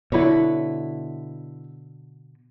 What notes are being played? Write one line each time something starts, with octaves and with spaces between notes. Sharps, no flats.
B2 D3 E4 B4 C#5